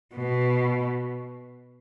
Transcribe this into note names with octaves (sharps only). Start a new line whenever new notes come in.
B2